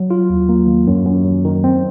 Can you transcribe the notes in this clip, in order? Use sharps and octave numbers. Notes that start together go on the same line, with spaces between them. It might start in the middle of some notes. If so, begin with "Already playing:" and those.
Already playing: F#3
F4
D#2
A#3
D#3
F#2
F#2
F#3
D#3
C4